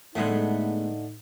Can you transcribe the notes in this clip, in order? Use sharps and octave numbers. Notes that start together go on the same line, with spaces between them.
A2 D3 G#3 A3 B3 D#4